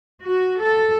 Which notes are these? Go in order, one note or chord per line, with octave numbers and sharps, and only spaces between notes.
F#4
A4